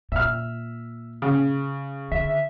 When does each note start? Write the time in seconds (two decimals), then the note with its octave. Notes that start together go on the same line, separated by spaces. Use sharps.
0.12 A#2 E5 F6
1.22 C#3
2.12 D3 E5